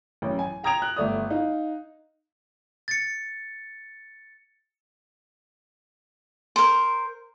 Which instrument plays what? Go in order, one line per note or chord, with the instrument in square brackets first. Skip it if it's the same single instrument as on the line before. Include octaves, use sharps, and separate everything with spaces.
[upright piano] A1 F#2
G#5
G5 A#5 D#6 G#6 D7 F7
F#6
G1 A3 D5 D#6
D#4 F5
[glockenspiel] A6 C#7
[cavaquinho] A#4 C5